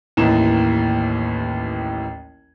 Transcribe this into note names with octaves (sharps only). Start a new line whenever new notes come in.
A1 D#2 E3 D#4 E7